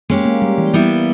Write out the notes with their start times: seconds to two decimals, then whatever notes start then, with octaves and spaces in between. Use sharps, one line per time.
0.10 G#3 A#3 C#4 G4
0.25 A#3
0.42 G3
0.58 E3
0.74 G3 B3 E4 G4 B4